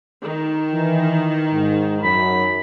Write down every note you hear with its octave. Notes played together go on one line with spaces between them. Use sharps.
D#3
E3
G#2
F#2 B5